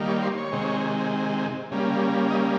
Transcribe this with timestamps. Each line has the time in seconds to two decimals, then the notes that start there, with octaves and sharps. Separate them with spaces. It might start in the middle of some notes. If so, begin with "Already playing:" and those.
Already playing: D#3 G3 A#3
0.08 C#5
0.22 C5
0.37 C#5
0.52 C3 D#3 G#3
1.71 C#3 G3 A#3
2.30 D#5